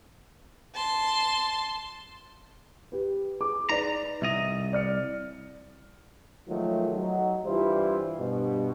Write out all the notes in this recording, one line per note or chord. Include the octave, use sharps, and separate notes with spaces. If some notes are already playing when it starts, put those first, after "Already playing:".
A5 C6
G4 B4
G#4 D6
D#4 B4 D5 A#5
C2 D#5 E5 F7
D5 F6 C#7
D#3 F3 F#3 G#3 A3
F#3 D#4
G2 E3 G3 E4 F4 C5
G2 B2